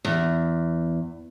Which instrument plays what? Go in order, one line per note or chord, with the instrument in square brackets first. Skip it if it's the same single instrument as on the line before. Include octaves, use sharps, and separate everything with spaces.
[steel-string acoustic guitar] E2